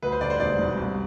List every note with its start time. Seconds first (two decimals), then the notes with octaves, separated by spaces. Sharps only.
0.03 D2 B4
0.12 C5
0.21 D3 D5
0.30 C5
0.40 E1 D5
0.59 E1
0.77 C2